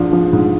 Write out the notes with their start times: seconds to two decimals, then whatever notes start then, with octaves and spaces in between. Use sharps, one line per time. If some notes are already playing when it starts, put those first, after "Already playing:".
Already playing: G#2 F3 D4
0.13 F3
0.33 G#2